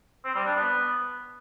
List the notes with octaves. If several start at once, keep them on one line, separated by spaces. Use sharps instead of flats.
C4
G3
D4
B3